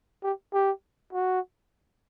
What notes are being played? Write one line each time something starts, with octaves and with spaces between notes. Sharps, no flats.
G4
G4
F#4